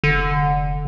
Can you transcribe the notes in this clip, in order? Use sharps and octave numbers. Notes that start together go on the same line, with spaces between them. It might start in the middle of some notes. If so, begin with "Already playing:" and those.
F1 D3